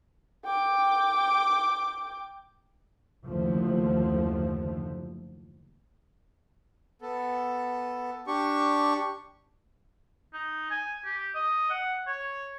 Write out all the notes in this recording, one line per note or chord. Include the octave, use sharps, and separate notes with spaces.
G5 D6
F#1 D#2 D3 F3 A3
B3 A4
D4 G4 C#6
D#4
G#5
G4
D#5
F#5
C#5